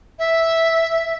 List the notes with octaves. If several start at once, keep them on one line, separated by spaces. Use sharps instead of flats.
E5